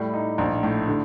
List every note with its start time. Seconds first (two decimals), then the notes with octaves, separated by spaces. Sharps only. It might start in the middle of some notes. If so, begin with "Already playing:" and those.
Already playing: A2 G3
0.14 D#4
0.38 A#1
0.63 A2
0.88 D3